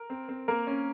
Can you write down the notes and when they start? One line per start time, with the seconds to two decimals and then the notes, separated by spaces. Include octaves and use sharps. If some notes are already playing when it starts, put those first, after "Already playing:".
Already playing: A#4
0.10 C4
0.29 C4
0.48 A#3 A#4
0.67 C#4